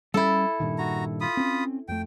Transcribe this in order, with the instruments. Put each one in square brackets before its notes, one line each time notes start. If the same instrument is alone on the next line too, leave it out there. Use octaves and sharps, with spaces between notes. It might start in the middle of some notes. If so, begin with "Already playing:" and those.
[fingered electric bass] G3 C#4 [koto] E4 A4
[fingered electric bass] G2 A#2 D#3
[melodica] F#4 A#5
F4 B5 D#6
[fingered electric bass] C4 C#4
[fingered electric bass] F2 A3 [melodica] G5